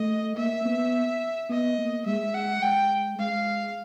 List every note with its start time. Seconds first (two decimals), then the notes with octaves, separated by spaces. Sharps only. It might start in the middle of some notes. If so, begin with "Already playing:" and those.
Already playing: A3 D#5
0.37 A#3 E5
0.65 B3
1.49 B3 D#5
1.78 A#3
2.06 G#3 E5
2.34 F#5
2.62 G#3 G5
3.19 G#3 F5